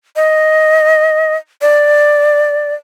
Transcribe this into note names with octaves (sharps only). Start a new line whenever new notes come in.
D#5
D5